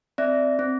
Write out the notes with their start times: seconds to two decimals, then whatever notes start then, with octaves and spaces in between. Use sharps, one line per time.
0.18 C4 D5 E5
0.59 C4